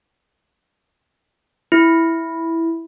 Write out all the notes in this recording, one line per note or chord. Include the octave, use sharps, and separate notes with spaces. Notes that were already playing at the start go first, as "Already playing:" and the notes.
E4